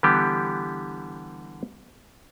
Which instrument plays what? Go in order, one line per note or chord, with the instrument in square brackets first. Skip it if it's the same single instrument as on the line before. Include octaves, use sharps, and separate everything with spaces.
[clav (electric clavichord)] D3 E3 G3 B3 G4